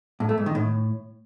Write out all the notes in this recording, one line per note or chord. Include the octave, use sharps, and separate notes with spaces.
A2
A3
G#2
D#3
A2